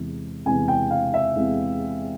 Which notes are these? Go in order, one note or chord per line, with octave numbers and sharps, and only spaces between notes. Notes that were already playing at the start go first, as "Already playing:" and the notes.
Already playing: E2 C3 E3 G#3
E2 C3 E3 G#3 G#5
G5
F5
E5
E2 C3 E3 G#3